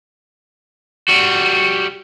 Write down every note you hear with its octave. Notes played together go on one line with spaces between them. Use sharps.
G3 F#4